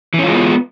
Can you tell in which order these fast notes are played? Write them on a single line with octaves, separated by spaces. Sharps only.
E3 C#4 F4 G#3 B3